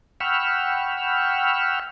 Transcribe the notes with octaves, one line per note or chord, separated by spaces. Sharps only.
F#5 G5 B5 C#6 E6 F6